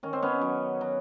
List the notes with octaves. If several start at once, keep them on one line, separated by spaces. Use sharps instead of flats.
D#3 C#4
C4
B3 C#4
F#3
F#3